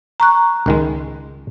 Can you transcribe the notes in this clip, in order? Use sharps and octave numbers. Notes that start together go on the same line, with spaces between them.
A#5 C#6 F#6
C#2 D#3 G#3